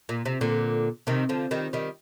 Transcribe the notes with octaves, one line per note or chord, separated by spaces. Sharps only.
A#2
C3
A#2 D3
C3 D#3
D3 F3
D#3 G3
D#3 G3